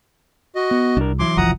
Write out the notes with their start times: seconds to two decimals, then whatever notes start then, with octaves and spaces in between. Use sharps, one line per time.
0.56 F#4 D#5
0.71 B3
0.97 C2 D4 A#4
1.19 E3 F#3 E4 C6 D6
1.37 F#1 C2 F3 F#5 A#5 D#6